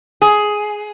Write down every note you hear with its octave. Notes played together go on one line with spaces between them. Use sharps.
G#4